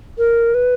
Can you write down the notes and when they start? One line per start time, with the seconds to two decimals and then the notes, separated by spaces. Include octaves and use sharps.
0.18 A#4
0.54 B4